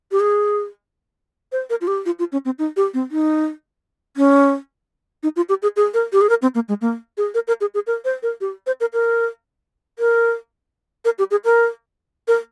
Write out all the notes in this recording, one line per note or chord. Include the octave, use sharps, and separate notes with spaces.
G4
G#4
C5
A#4
F4
G4
F4
F4
C#4
C4
D#4
G4
C4
D#4
C#4
D#4
F4
G4
G#4
G#4
A#4
G4
G#4
A#4
C4
A#3
G#3
A#3
G#4
A#4
A#4
G#4
G#4
A#4
C5
A#4
G4
C5
A#4
A#4
A#4
A#4
G4
G#4
A#4
A#4